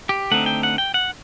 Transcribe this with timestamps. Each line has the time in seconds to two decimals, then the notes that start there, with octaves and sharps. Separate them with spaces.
0.09 G4
0.31 D3 A3 C4 D#4 F#5
0.46 G5
0.63 F#5
0.78 G5
0.94 F#5